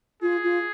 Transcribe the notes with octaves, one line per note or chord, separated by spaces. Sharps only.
F4 G#4
F4